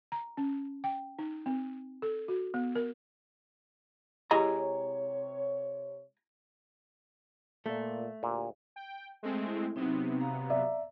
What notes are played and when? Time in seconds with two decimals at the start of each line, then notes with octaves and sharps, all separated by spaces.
0.12 A#5
0.37 C#4
0.84 G5
1.19 D#4
1.46 C4
2.02 A4
2.28 F#4
2.54 B3
2.75 A#4
4.31 C3 G#3 E4 G4 C#5 G#5 A#5
7.66 A#2 A3
8.23 D2 A#2 G4 G#4
8.76 G5
9.23 G#3 A3 C4
9.47 E4
9.76 C3 F#3 B3 C4 D#4
10.21 F5 A#5
10.50 D5 E5